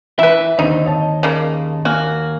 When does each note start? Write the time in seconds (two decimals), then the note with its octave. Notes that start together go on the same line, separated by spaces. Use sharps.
0.19 E3 E4 B4 E5
0.59 D#2 D3 C4 D#4
0.85 C#5 D#5 A5
1.23 C#3 A#3
1.85 A#3 F#4 G#5 F6